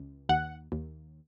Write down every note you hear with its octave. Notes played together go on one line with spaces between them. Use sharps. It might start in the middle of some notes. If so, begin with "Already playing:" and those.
Already playing: C#2
D#2 F#5
D#2